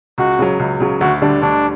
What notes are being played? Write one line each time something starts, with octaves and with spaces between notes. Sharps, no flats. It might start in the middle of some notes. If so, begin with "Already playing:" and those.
C#2 F#4
C#3 F#3
C#2
C#3 F#3
D2 F#4
D3 G3 D4
D2 D4